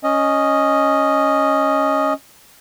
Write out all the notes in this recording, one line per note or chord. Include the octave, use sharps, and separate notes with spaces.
C#4 D#5